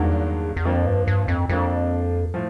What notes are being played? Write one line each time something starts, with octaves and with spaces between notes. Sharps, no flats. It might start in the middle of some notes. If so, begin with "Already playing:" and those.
Already playing: E2 G2 D#3 F#3 A#3 D4
E2
F2 F3 A#3 D4
G2
G2
F2
F2 F3 A#3 D4
A2 F3